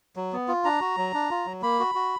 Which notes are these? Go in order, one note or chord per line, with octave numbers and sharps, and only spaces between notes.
F#3
B3
F4
D4 A#5
F#4
F#3
D4
F4
F#3
A#3 B5
F#4
F#4